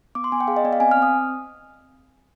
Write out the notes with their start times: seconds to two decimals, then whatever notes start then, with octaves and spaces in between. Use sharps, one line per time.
0.15 B3 D6
0.24 C6
0.32 B3 G#5
0.41 G5
0.47 G#4 F5
0.57 D#5
0.64 B3 D5
0.73 F5
0.80 C4 G#5
0.91 F6
0.97 C4
1.02 D#6